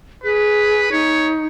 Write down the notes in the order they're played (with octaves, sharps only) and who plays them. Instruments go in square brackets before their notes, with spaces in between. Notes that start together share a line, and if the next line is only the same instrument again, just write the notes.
[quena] G#4 [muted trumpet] B4
[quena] D#4 [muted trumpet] C#5